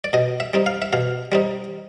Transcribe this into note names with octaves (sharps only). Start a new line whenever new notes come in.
D5
B2 D#5
E5
G3 C4 D#4
F5
E5
B2 F5
G3 C4 D#4